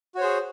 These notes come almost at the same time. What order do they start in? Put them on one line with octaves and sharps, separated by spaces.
F#4 C#5 C5 G#4